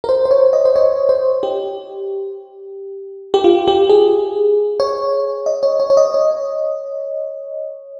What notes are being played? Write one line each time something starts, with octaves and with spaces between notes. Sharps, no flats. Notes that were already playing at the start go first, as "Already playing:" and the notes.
A#4
C5
C5
C#5
D#5
C5
C#5
C5
G4
G4
F4
G4
G#4
C#5
D#5
C#5
C#5
C#5
D#5
C#5